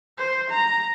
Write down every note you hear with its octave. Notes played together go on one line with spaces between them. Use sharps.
C5
A#5